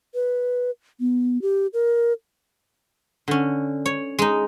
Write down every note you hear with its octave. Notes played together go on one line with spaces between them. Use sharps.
B4
B3
G4
A#4
D3 C#4
C#5
G#3 D#4